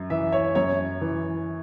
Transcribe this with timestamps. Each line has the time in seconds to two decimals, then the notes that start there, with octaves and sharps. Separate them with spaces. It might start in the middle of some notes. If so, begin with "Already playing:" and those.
Already playing: F#2
0.10 E3 E5
0.32 C#5
0.55 F#2 C#5
1.01 E3